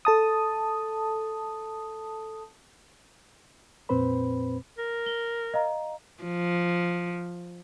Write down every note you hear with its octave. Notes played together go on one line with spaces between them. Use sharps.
A4 A5 D#6
F2 A#2 C4 B4 C5 B5
A#4
G7
D#5 F5 A#5
F3